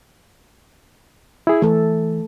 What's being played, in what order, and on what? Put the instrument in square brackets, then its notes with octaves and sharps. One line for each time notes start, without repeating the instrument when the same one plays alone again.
[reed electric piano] E4 G#4
[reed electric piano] E3 [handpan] A3 A4